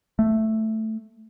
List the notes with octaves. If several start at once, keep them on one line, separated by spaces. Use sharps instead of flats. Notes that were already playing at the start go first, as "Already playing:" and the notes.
A3